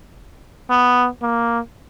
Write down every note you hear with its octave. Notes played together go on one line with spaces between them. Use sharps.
B3
A#3